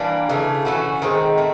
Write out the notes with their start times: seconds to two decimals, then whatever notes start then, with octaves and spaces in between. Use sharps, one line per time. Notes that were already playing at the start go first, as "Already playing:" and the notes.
Already playing: E3 G3 A#3 D4
0.29 C#3 E3 A3
0.65 E3 A3 C#4 F#4
1.02 D#3 G#3 C4
1.38 A3 C4